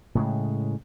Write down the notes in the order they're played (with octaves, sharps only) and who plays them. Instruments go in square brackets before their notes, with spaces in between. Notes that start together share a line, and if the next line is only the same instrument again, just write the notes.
[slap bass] A2 C#3 G#3